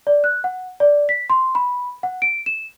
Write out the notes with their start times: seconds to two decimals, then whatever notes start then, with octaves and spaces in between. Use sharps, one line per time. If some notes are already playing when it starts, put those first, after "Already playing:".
0.07 D5
0.24 F#6
0.44 F#5
0.80 D5
1.09 B6
1.30 C6
1.55 B5
2.03 F#5
2.22 D7
2.46 E7